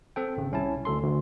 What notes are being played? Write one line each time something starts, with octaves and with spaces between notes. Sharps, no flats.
C4 A4 G5
G#1 C#3
C2 C#4 E4 A5
D2 A4 C6
D2